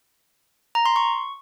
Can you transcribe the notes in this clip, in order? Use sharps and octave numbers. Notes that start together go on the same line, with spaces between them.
A#5
C6
C#6